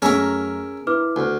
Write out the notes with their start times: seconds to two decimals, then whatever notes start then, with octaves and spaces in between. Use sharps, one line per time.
0.02 F#2 A3 C#4 G#4 A#4 D#5 E5 A#5
0.87 E4 B4 D6 F6
1.16 D2